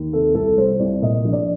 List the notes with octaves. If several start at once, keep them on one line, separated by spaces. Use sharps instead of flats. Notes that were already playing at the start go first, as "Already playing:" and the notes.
Already playing: D#2
C3 A4
C2 A4
G3 C5
C2 D5
A#2 D#5
A#1
D5